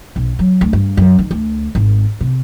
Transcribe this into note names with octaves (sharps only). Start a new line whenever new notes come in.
B1
F#3
D2
G2
F#2
D#3
D2
G#1
C3